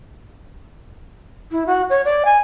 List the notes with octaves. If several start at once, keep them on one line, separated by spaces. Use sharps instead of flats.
E4
F#4
C#5
D5
G#5